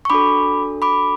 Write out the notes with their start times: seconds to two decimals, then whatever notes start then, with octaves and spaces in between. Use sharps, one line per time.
0.05 C#6
0.10 D4 F#4 A4 B5 D6
0.82 B5 D6